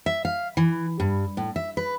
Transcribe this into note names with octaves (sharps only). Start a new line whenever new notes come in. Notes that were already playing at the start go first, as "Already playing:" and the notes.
E5
F5
E3
G2
A2
E5
B4